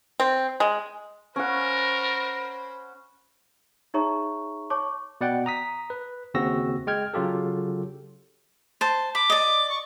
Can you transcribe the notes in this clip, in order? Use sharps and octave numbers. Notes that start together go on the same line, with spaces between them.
C4
G#3
C#4 A#4 C5 F#5 B5
D#4 G#4 C#5 E5 A#5 C#6
C#5 A5 C#6 D6
B2 D5 F#5 G5
A#5 D#6 B6
B4
D#2 C#3 C4 F#4 E6 A#6
G#3 G5 F6 G#6
C#3 F#3 F4 G4 A4
C5 A5
B5 D6
D5 D#5
C#6